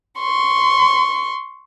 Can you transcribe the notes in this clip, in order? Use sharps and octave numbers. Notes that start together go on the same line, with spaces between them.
C6 C#6